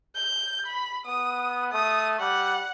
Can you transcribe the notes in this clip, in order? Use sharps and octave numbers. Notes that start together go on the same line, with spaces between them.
G6
B5
B3 D#6
A3 D#6
G3 F#5